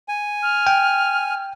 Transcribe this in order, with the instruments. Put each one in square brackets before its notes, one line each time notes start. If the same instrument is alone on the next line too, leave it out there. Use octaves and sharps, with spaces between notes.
[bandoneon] G#5
[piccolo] F6
[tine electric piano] G5